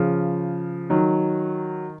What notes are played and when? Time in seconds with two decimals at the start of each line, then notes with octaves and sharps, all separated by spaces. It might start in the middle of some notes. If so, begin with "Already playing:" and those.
Already playing: C#3 F3
0.90 D#3 F#3